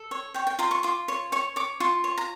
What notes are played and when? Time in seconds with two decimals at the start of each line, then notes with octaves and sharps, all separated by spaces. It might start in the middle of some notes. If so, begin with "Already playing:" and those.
Already playing: A4
0.11 C#5
0.34 C#5 G5
0.47 G5
0.59 F4 A#5
0.71 C#6
0.83 F4 D6
1.08 C#5
1.32 C#5 C#6
1.56 C#5 D6
1.80 F4 C#6
2.04 C#5
2.18 A#5